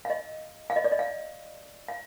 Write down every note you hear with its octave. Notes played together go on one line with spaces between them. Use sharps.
F5
D#5
F5
D#5
D5
D#5
F5
F5